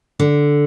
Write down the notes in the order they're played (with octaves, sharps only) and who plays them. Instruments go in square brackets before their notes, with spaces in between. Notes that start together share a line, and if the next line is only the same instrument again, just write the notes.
[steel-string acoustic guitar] D3